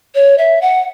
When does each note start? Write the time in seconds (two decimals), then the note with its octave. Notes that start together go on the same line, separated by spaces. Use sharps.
0.15 C#5
0.38 E5
0.62 F#5